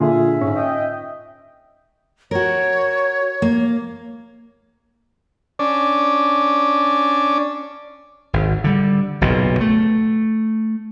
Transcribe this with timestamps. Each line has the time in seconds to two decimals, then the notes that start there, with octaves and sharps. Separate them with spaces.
0.01 A#2 D3 F4 G#4 E5
0.41 G#2 C#4
0.57 D#5 G5
2.31 F#4 A#4 C#5
3.42 A#3
5.59 C#4 D4 D5
8.33 G#1
8.64 D3 G3
9.21 F#1 B1 A#2
9.61 A3